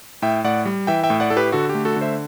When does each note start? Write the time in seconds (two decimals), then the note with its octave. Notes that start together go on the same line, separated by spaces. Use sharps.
0.22 A2 E5 G5
0.44 A2 D5 F#5
0.65 G3
0.87 E3 E5 G5
1.03 E5 G5
1.10 A2
1.20 D5 F#5
1.30 A2 A4
1.36 G4 B4
1.52 D3 F#4 A4
1.69 G4
1.75 A3
1.85 F#4 A4
1.96 D3
2.01 C5 E5